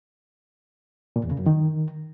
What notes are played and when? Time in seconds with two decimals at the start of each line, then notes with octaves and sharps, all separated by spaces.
1.16 A#2
1.23 E2
1.31 C#3
1.39 F#2
1.46 D#3